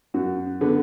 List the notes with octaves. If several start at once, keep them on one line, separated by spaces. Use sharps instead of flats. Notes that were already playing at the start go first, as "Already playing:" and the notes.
F#2 F#4
D3 B3